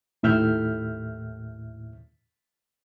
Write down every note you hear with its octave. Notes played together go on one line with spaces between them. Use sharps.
D#2 A2 E5 F6 G6